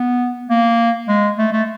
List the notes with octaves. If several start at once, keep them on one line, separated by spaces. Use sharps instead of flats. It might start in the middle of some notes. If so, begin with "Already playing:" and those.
Already playing: B3
A#3
G#3
A3
A3